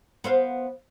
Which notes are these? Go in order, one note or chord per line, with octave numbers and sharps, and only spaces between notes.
B3 C5 F5